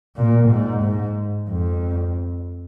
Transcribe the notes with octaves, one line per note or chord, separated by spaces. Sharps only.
A#2
G#2
G#2
F2